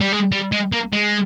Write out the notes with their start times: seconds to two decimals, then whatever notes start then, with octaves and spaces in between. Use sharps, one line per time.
0.01 G3
0.12 G#3
0.32 G3
0.52 G#3
0.72 A#3
0.93 G#3